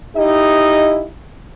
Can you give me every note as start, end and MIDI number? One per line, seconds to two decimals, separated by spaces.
0.17 1.05 63
0.17 1.05 64
0.17 1.05 67
0.17 1.05 75